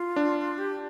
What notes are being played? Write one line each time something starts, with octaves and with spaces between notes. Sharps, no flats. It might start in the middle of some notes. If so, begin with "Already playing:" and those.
Already playing: F4
D4
G4